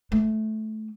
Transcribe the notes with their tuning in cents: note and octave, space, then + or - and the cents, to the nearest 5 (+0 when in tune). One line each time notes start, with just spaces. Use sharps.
A3 -15